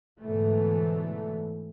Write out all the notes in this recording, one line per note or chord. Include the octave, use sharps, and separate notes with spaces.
G#2 B2 D3 E3 A3